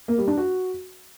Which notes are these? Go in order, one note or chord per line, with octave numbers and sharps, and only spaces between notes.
A#3
G3
D4
F#4